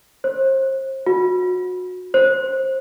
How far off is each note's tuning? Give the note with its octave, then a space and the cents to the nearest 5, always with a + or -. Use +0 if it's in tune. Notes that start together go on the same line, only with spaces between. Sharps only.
C5 +35
F#4 -25
C5 +20